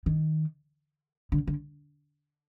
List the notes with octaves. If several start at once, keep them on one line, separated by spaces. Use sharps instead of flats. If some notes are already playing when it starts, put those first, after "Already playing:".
D#3
D3
D3